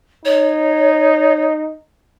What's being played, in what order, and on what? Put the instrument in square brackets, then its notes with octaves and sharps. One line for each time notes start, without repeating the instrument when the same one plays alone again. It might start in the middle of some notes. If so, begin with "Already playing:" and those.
[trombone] D#4 [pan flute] C#5